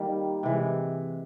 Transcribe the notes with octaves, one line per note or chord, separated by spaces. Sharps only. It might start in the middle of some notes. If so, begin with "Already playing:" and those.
Already playing: D#3 G3 A#3
C3 E3 G#3